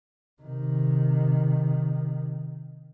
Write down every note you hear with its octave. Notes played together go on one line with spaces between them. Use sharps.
C3 D#3